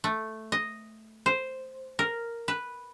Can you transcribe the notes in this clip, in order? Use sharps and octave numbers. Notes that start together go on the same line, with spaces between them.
A3
D#5
C5
A#4
B4